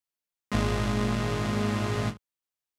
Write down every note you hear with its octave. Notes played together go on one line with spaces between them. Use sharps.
G#1 A#2 G#3